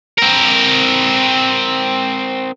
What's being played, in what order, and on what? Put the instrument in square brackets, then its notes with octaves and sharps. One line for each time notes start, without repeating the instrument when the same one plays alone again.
[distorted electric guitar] C4 A#4